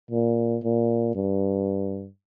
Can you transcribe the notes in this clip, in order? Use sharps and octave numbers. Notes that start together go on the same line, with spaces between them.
A#2
A#2
G2